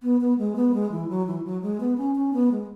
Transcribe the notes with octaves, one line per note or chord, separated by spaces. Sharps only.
B3
B3
G#3
B3
G#3
E3
F#3
E3
F#3
G#3
B3
C#4
C#4
B3
G#3